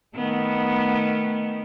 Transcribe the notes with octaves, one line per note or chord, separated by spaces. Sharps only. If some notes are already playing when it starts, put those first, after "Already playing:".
D#3 A3 B3